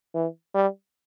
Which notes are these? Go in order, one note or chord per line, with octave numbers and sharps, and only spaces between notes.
E3
G3